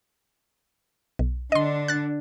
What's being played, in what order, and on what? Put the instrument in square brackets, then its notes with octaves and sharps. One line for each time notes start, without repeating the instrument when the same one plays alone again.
[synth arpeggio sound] B1
[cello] D3 D4 [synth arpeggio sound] D#5 C6
[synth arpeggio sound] F#6 A6